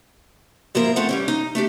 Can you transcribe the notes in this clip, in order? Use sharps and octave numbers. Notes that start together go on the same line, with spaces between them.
G#2 F3 A#3 E4 A#4
A3 C4 F4 A4 F#5
E3 G3 C#4
D#4
A3 D4 G4